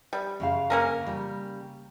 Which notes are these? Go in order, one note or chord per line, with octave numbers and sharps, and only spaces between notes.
G3
F#2 C#3 F5
A#3 C#4 A#4
C#3 G3